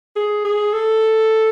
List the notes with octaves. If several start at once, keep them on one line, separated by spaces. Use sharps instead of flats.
G#4
G#4
A4